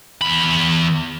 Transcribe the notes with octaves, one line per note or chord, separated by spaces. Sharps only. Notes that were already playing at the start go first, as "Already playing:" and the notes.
E2 B5